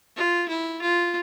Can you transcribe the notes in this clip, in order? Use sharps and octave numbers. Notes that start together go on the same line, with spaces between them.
F4
E4
F4